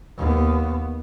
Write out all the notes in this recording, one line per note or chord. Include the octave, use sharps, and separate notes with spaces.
D#2 B3